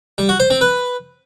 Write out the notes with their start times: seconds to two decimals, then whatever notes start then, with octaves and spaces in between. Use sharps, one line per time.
0.18 G3
0.29 F#4
0.40 C5
0.50 C4
0.61 B4